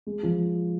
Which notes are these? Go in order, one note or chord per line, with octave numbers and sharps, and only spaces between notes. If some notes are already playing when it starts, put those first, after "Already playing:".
G#3
F3